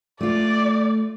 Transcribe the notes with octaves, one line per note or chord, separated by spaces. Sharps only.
A3 F4 D5